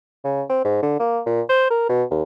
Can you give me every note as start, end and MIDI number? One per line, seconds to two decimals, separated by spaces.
0.24 0.42 49
0.49 0.64 60
0.64 0.79 44
0.82 0.97 50
0.99 1.21 58
1.26 1.41 46
1.49 1.67 72
1.70 1.88 70
1.89 2.03 47
2.11 2.23 39